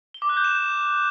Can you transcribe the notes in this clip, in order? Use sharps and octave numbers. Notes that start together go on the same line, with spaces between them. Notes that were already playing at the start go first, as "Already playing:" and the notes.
G7
D6
F#6
G6
E7